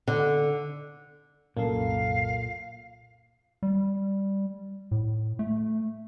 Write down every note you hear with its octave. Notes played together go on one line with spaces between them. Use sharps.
D3
C2 F#2 A#2 A#3 A4 F5
G3
A2
A3